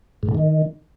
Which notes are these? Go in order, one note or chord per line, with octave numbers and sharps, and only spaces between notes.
G#2
A2
D#3